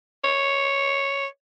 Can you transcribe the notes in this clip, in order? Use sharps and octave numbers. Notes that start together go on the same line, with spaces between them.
C#5